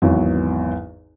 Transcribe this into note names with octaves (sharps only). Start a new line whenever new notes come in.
G#1 E2 F#3 B3 F#4